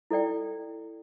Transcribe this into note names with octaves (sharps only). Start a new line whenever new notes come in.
E4 A4 D5 G5